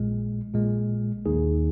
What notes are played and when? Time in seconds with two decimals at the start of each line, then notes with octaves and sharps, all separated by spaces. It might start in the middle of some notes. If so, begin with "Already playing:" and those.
Already playing: A#1 A#2 G#3
0.54 A#1 A#2 G#3
1.26 D#2 D#3 A#3 D#4 G#4